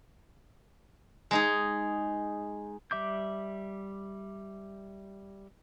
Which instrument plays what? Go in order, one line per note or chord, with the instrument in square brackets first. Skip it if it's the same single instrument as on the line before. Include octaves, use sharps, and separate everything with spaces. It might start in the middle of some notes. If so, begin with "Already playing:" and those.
[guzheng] G#3 D#4 G#4
[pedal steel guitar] G3 E5 D6 G6